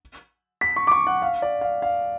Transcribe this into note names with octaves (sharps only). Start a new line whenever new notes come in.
B6
C#6
D6
C#6
F#5
F5
D5
F5
F5